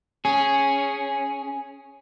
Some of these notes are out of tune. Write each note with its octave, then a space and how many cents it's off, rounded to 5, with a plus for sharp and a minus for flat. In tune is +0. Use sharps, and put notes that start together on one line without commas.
C#4 +0 G#4 +0